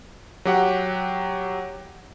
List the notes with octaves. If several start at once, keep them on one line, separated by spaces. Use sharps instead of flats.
F#3 G4 F#5